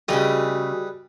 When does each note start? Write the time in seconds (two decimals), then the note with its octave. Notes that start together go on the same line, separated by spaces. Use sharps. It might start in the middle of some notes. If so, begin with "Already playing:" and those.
0.08 C#3 G3 A3 F#4 G#4 B4 D#5